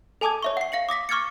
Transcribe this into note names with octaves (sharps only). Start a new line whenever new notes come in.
A4 G#5 A5 D6 D#6 G#6
C#5 E5 C#6
F#5 C7
F5 A#6 C#7 F#7
D6 D#6 A#6 B6
C#6 D6 F6 G#6 A6 C#7